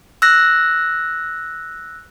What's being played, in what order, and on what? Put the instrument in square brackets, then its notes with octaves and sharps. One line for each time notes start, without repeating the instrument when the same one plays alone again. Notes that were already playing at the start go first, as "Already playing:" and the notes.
[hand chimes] E6 F#6 A#6